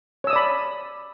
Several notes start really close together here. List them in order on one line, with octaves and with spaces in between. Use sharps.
C#5 E6 D#6 D5 B5